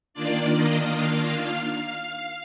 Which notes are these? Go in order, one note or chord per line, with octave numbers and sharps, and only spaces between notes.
D#3 A#3 D4 F4 D5
D#5
F5